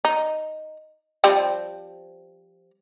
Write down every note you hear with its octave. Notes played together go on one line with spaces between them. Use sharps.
D#4
F3 G3 C4